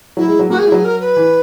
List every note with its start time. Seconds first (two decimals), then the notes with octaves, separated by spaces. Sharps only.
0.17 F#3 E4
0.28 G#3
0.39 F#3
0.50 A#3 F#4
0.59 G#4
0.62 G#3
0.68 E4
0.72 F#3 G#4
0.84 A#4
1.00 B4
1.17 E3